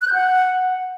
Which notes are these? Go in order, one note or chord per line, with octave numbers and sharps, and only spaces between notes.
F#6
G6
F#5